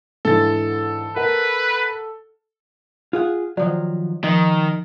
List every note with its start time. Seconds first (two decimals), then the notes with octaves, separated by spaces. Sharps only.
0.25 G#2 D3 E3 A4 A6
1.16 A#4 B4 F#5
3.13 F4 G#4 F#5
3.57 D#3 F3 F#3 D5
4.24 D#3 F3 D#5